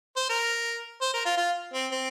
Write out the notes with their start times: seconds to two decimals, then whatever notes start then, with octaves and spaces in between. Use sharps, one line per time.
0.17 C5
0.30 A#4
1.01 C5
1.14 A#4
1.25 F4
1.37 F4
1.74 C4
1.91 C4